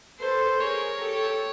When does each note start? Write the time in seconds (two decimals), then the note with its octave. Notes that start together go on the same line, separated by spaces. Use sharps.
0.20 A4 B4 C5
0.60 G#4 A#4 C#5
1.00 G4 A4